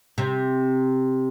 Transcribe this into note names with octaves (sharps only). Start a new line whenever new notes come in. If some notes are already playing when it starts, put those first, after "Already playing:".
C3